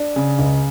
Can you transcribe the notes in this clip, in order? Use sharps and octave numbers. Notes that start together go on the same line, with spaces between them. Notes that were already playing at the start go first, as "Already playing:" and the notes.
Already playing: D4
C#3
C#2